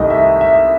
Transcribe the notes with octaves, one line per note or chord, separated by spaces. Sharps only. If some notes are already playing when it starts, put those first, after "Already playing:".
Already playing: C2 C3 D#3 A3 D#5
E5
E5